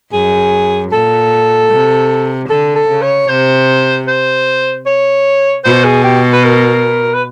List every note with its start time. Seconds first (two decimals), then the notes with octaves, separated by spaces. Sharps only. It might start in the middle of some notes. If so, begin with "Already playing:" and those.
0.13 F#2 G#4
0.92 A#2 A4
1.70 C3
2.49 D3 A4
2.75 A4
2.88 C#3
3.02 C#5
3.28 C3 C5
4.08 C5
4.86 C#5
5.64 B2 C5
5.84 G#4
6.04 G4
6.33 B4
6.44 A#4
7.14 B4